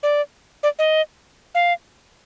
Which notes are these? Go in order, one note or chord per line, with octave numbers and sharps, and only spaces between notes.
D5
D5
D#5
F5